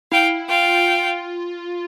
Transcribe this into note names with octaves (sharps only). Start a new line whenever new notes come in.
E4 F5 G5
F4 F5 G5